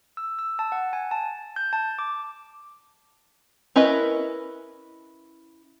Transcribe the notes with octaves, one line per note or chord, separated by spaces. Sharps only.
E6
E6
A5
F#5
G#5
A5
G6
A5
D6
C#4 E4 A#4 B4 D#5